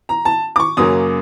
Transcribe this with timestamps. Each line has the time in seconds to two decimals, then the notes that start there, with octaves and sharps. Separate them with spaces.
0.09 A#5
0.25 A5
0.56 D6
0.60 C#6
0.77 F#2 C#3 F#3 A#3 C#4 D#6